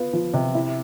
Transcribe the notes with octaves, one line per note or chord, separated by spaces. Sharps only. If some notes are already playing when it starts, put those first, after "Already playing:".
Already playing: B3 F4
F3
C3
E4